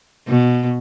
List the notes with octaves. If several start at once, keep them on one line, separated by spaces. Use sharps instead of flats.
B2